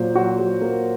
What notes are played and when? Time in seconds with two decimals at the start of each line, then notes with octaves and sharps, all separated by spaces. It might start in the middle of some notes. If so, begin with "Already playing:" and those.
Already playing: A#2 F#3 C5
0.15 F#3 F#4
0.39 F#3
0.61 A#3 A#4